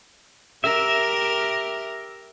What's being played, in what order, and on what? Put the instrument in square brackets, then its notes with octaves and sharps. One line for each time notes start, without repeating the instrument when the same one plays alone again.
[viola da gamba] G4 A#4 [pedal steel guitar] E5